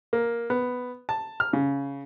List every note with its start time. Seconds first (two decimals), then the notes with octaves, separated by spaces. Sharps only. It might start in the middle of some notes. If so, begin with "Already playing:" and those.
0.13 A#3
0.50 B3
1.09 A5
1.40 F6
1.53 C#3